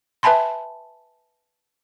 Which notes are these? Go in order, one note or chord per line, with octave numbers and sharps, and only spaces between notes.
B4 E5 G#5 A5 B5 C6